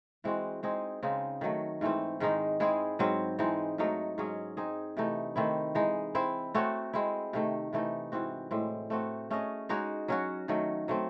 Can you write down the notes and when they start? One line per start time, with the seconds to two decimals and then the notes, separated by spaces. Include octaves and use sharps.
0.24 E3 G#3 C4 F#4
0.63 G#3 C4 D#4 G#4
1.03 C#3 G#3 C4 D#4
1.41 D#3 F#3 A3
1.81 G#2 E3 A3 C4
2.20 G#2 D#3 G#3 D#4
2.60 G#3 C4 E4 G#4
2.99 G#2 F#3 C4
3.39 E3 G#3 C4 D#4
3.78 G#2 F#3 A3 D#4
4.18 G#2 F#3 C#4 G#4
4.57 C4 D#4 G#4 D#5
4.97 C3 E3 A3 D#4
5.36 D#3 A3 C4 E4
5.75 E3 G#3 D#4
6.15 C4 E4 C5
6.55 A3 C4 F#4 C#5
6.94 G#3 C4 E4
7.33 C3 D#3 A3
7.73 C3 E3 A3 D#4
8.12 G#2 E3 C4 F#4
8.51 A2 G#3 C4
8.90 A3 C4 F#4
9.30 A3 C#4 G#4 D#5
9.69 G#3 D#4 F#4 C#5
10.08 F#3 C#4 F#4
10.48 D#3 F#3 A3
10.88 F#3 A3 C4